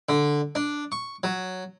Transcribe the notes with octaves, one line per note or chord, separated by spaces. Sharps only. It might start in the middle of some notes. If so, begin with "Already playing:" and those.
D3
D4
C#6
F#3